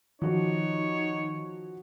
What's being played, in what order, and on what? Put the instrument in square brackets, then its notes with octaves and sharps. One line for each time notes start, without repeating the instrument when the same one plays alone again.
[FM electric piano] D#3 [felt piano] F3 F#4 [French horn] D#4 [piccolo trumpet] C#5